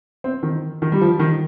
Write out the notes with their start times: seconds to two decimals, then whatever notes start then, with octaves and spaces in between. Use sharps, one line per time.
0.24 C4
0.43 D#3
0.82 D#3
0.92 G3
1.01 F3
1.19 D#3